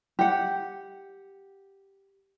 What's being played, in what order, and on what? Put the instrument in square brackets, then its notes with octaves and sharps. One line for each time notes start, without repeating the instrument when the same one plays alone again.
[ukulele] G4 F#5